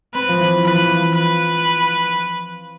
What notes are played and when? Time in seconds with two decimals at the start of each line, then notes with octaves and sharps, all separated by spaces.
0.14 C4 B4
0.29 F3
0.40 E3
0.64 F3 B4
0.76 E3
0.87 F3
1.14 B4